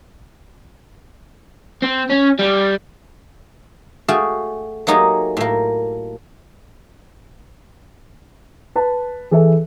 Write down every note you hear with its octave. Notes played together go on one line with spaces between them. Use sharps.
C4
C#4
G3
A3 F#4 G#4 F5 G5
F#3 A3 A#3 D#4 G4 G#4
A2 A#3
B4 A5
E3 G#4 A4 E5